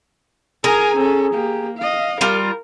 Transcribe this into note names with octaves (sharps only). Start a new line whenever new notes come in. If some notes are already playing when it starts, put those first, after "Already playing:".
G#4 A#4 G#5 A#5
C#4 A4
A#3 G4
D#5 F5
G3 F4 A#4